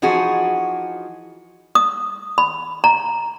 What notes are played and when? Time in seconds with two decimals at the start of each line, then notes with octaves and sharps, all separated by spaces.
0.02 E3 F3 D#4 F#4 G#4
1.75 D#6
2.38 B5
2.84 A#5